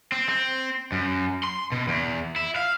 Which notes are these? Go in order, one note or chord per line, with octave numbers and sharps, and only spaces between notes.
C4
C4
F#2
C6
B2
E2
E4
F5